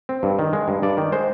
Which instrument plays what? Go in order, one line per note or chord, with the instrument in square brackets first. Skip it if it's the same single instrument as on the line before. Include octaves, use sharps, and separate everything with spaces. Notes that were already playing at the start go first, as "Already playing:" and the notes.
[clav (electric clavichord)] C4
G2
D#3
G#3
G2
G2 D5
D#3
G#3 C5